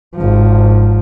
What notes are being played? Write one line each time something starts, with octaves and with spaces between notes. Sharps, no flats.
G#1 F3